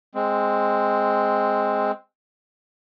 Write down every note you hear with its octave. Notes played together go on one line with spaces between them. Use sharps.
G#3 C4